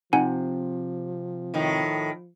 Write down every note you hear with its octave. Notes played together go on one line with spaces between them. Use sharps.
C3 F3 D#4 F#5 G#5
A2 D#3